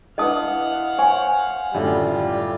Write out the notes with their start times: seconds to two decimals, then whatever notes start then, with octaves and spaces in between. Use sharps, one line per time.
0.18 D4 E4 B4 D#5 F5 F#5 A5 D#6
0.98 C5 C#5 G#5
1.74 F#2 A2 D3 G3 F4